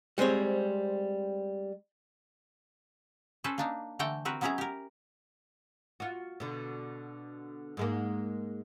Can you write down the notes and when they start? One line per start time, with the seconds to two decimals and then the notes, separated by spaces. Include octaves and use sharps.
0.18 G3 G#3 C4 C5 C#5
3.44 C#4 A4 B4 C5
3.58 A#3 D4 D#4
3.99 D3 E3 A3 F#5 G5 A#5
4.25 C4 F#4 A#4 B4
4.41 F#3 B3 C#4 E4 G#4 A#5
4.58 G4 A#4
6.00 F4 F#4
6.40 B2 D3
7.77 G#2 G#3 A#3